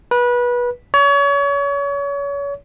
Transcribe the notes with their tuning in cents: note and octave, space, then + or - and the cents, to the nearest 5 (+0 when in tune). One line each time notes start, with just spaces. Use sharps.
B4 -25
C#5 +30